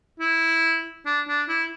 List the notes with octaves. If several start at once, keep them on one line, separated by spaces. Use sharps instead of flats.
E4
D4
D4
E4